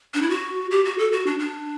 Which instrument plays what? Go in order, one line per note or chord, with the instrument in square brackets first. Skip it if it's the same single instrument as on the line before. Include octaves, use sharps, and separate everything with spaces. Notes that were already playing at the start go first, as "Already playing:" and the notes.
[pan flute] D4
E4
F#4
G4
F#4
A4
F#4
D4
D4